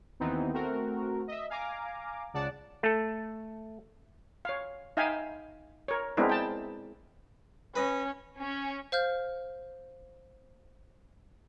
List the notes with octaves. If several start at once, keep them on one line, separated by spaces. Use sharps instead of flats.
D#2 D#3 E3 B3 C4 D#4
A3 C4 F#4 A#4
D#5 E5
F5 G#5 A#5 D6
C#2 C#3 D5 F#5 A5
A3 A4
C#5 F5
D#4 E5 F5 G5 G#5
A#4 C#5
G#3 B3 C4 D4 E4 A#4
G5 A5
C#4 B4 D#5
C#4
C5 F5 F6 G6